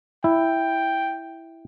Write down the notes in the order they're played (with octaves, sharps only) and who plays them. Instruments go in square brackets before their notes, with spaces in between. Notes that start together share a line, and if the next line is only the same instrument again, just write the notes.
[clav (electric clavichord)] E4 [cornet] G5